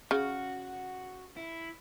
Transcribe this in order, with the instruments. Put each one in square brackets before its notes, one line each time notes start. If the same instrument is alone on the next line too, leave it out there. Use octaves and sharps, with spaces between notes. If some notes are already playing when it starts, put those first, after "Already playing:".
[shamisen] C#3 [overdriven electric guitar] F#4
[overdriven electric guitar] E4